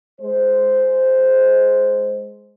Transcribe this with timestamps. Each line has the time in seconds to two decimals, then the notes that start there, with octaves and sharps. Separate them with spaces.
0.20 G#3 C5